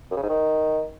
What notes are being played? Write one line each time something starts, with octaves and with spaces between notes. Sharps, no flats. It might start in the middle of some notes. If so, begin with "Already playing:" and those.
F#2
C#3
G#2
D#3